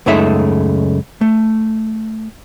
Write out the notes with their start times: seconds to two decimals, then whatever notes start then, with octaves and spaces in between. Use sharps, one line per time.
0.06 C#2 F#2 G#3 A3 D#4 E5
1.21 A3